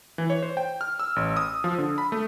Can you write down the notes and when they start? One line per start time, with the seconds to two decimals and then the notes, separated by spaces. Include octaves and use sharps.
0.18 E3
0.30 C#5
0.42 C5
0.57 G5
0.81 F6
0.99 E6
1.16 A1
1.37 D#6
1.64 F3
1.78 D3
1.98 B5
2.12 A3